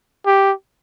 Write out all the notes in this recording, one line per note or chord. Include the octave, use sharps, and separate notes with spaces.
G4